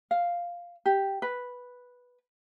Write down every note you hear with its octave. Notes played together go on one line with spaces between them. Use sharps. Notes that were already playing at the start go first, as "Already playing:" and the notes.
F5
G4
B4